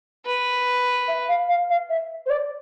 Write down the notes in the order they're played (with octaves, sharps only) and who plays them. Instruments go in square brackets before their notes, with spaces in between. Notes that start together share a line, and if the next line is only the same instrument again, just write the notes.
[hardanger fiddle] B4
[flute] E5
F5
F5
F5
E5
C5
D5